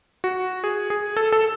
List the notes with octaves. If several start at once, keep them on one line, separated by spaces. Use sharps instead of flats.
F#4
G#4
G#4
A4
A4